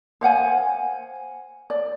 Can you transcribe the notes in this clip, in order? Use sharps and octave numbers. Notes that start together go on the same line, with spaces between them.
C5 F5 F#5 G#5
D5